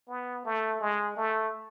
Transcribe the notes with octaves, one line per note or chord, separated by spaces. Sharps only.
B3
A3
G#3
A3